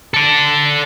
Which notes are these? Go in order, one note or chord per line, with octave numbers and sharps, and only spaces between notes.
A4 D5